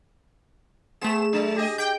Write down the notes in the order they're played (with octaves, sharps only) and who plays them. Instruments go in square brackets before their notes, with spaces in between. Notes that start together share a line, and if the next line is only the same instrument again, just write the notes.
[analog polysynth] A3 E7 [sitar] B3 G#4
[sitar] F#3 D4
G4 G#4 D#5
[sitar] G4 [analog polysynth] G5 G6